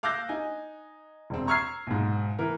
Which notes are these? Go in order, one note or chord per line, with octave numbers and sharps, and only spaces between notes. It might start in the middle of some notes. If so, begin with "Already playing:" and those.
F5 D6 E6 F#6 G6 A#6
D#4 G#5
E1 C4
A#5 C#6 E6 F6 G#6 C7
B1 G#2
E3 A#4